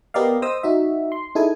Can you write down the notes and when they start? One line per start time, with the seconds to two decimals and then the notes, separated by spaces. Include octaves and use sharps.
0.14 B3 G4 A#4 D5 D#5 F5
0.42 C5 D#5 D#6 E6
0.63 D#4 F#4 E5
1.12 C6
1.35 D#4 E4 G#4 A4 G#5